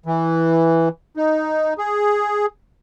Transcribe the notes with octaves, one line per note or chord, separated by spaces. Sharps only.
E3
D#4
G#4